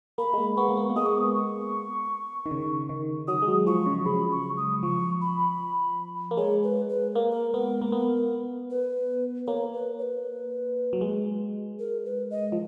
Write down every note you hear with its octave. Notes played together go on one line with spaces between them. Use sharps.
A#3 B5
G#3
A#3
B3 C#6
A#3
B3
A#3
G#3 D#6
C#6
D#6
C#6
D#3
C#3
D#3
F#3 D#6
G#3
F#3
F3 C#6
C#3
C#3 B5
C#6
D#6
F3 C#6
B5
A#3
G#3 C#5
B4
B4
A#3 A#4
A#4
B3 A#4
A#3
B3
B4
A#3 C#5
B4
C#5
B4
F#3
G#3
A#4
B4
D#5
F3